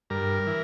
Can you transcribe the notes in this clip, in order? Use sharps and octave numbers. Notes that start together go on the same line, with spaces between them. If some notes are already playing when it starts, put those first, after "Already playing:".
G2 A#4
E3